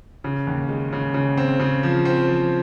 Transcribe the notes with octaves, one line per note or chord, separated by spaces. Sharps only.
C#3
D#2
G#3
C#3
C#3
C4
C#3
F3
C4
F3